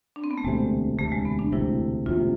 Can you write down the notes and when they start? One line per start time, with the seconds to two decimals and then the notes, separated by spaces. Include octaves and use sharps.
0.16 D4
0.24 C4
0.31 B3
0.38 A3
0.44 E1 D2 C3 G#3
0.99 E1 D2 C3 A3
1.12 G#3
1.25 B3
1.39 D4
1.52 E1 D2 C3 E4
2.06 E1 D2 C3 F4